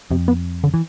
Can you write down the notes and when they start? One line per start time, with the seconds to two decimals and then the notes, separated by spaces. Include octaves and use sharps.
0.11 F2 C3
0.28 B3
0.64 D3
0.74 E3